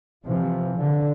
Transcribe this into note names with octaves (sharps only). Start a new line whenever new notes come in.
C3 E3 F3
D3